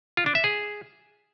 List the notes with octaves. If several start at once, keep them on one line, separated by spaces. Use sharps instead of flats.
F4
D4
E5
G#4